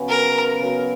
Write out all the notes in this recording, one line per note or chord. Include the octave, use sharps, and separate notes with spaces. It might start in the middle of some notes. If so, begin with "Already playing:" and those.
Already playing: C#3 F#3 B3
A#4
C#3 F#3 B3